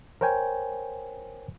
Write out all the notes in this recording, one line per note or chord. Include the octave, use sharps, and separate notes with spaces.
A#4 C5 C#5 G5 G#5